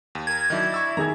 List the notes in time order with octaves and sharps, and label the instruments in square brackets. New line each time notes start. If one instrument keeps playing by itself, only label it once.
[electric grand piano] D#2
[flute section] A#4 [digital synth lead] G#6
[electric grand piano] D#3 F#3 [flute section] D4 E4 D#5
[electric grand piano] C#6 E6 A6
[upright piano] D#3 G#4 G#6 [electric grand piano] A#5